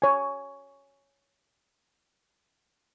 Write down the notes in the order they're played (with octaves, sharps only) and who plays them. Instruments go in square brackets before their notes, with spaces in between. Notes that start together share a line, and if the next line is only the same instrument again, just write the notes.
[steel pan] C#5 G#5